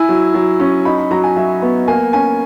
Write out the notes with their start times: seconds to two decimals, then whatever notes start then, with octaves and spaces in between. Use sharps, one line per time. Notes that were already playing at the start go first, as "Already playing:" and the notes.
Already playing: E4 G#5
0.09 F#3
0.34 F#3
0.60 C#4
0.85 D#4 B5
0.98 B5
1.11 F#3 A#5
1.24 G#5
1.36 F#3 E5
1.62 B3
1.88 A#3 G#5
2.13 C#4 G#5